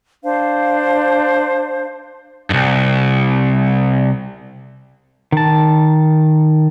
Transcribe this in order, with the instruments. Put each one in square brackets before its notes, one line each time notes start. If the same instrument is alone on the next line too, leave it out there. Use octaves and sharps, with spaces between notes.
[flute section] D4 C5 F5
[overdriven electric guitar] C2 G2
[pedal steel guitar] D#3 A5